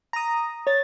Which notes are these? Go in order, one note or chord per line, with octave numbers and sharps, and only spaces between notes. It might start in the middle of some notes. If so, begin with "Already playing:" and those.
A#5 D#6
C#5 A6